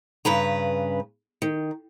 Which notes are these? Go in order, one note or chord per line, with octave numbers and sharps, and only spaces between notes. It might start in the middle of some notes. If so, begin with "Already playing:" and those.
G2 C#3 B4 A#5
D#3